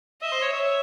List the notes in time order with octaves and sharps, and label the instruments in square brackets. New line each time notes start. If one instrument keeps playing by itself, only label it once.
[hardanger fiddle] D#5 [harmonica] E5
[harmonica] C5
C#5
[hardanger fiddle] C#5 [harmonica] E5